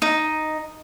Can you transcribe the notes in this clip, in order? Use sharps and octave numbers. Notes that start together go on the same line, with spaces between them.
D#4